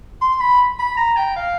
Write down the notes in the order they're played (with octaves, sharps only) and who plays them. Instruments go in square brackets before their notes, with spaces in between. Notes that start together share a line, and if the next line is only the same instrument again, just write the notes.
[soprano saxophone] C6
B5
B5
A#5
G5
F5